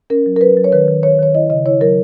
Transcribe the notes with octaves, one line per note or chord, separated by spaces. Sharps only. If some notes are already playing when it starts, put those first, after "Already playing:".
C#4 A#4
F#3
A#4
F#3 B4
F#3
C#5
D#3 B4
D#3
D#3 C#5
D#3 C#5
E4 D#5
C#3 D#5
E4 C#5
F#3 A#4